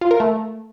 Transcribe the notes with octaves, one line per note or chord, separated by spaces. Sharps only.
F4
A#4
A3